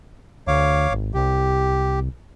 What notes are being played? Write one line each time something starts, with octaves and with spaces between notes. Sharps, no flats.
D2 C#5 F5 D6
G#1
C2 G4